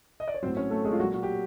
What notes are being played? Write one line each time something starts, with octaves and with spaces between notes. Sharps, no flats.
D#5
D5
C#5
A2 F#3 C4 C5
C#4 C#5
A3 A4
G#3 G#4
F4
A#2 F#3 F#4
F#4
G4